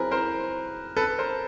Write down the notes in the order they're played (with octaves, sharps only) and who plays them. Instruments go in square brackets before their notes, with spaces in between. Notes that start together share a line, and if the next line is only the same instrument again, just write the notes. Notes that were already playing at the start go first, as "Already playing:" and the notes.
Already playing: [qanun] F#3 C4 E4 [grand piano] G#4 A#4 B4
[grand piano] A#4 C5
A4 B4
A#4 C5